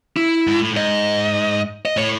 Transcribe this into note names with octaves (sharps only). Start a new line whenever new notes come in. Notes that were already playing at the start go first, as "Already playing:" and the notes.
E4
G#2
A2
G#2 D#5
D#5
A2 C#5